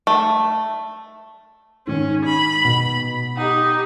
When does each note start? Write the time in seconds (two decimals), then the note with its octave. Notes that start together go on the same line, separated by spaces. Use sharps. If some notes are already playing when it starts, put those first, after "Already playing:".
0.07 A3
1.87 G#2 D#3 C#4
2.25 B5
2.65 B2
3.37 D#4 G4 F#5